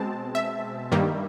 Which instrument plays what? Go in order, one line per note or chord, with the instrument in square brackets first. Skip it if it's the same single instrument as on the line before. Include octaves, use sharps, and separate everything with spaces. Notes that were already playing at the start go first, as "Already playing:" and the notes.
Already playing: [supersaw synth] B2 G#3 C4 A5
E5
G2 D#3 G3 A#3